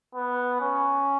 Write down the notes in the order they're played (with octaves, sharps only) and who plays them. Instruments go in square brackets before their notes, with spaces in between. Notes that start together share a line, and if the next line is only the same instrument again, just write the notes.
[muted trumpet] B3
C#4